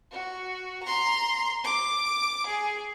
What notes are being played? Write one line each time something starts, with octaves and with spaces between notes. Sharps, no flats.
F#4
A#5 C6
D6
G#4